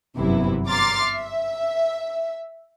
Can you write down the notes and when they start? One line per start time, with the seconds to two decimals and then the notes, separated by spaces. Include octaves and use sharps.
0.17 G1 F#2 C3 E3 B3 E4
0.67 A#5 C6 D6 F6 A6 C7
1.06 E5